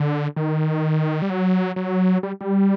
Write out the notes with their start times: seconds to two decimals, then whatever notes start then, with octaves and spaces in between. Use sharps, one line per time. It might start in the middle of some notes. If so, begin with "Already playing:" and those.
Already playing: D3
0.37 D#3
1.22 G3
1.30 F#3
1.76 F#3
2.23 G3
2.41 G3